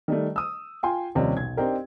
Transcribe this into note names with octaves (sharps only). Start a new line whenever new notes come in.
D#3 G3 A3
D#6 E6
F4 G5 G#5 C6
D#2 C3 D#3 F3 G3 C#4
B1 G#6
C4 D4 D#4 G4 A#4